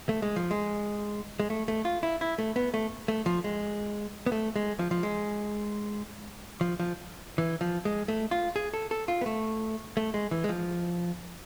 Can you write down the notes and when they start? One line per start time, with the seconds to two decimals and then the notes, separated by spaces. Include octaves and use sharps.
0.09 A3
0.22 G#3
0.36 F3
0.51 G#3
1.40 G#3
1.50 A3
1.68 A3
1.85 F4
2.03 E4
2.21 E4
2.38 A3
2.56 B3
2.74 A3
3.08 A3
3.26 F3
3.44 G#3
4.26 B3
4.32 A3
4.56 G#3
4.79 F3
4.91 F3
5.03 G#3
6.61 F3
6.80 F3
7.38 E3
7.61 F3
7.85 G#3
8.08 A3
8.31 F4
8.56 G#4
8.74 A4
8.91 A4
9.08 F4
9.21 B3
9.26 A3
9.97 A3
10.14 G#3
10.31 E3
10.44 G#3
10.49 F3